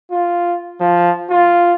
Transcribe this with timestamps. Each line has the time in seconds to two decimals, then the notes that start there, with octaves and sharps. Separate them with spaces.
0.12 F4
0.81 F3
1.30 F4